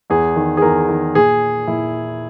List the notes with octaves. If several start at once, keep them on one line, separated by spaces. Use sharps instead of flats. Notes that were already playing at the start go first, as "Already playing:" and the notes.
E2 G#4
D#3
G#4
E2 A#4
D#3
A#2 G#4
A#2 E4